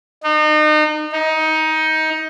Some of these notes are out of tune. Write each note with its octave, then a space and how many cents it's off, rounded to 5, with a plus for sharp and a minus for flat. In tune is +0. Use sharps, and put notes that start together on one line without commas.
D#4 -35
D#4 +20